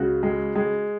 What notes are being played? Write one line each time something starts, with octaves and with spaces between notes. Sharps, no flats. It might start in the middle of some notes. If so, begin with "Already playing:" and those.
Already playing: C#2 C#3 F#4
G#3
G#3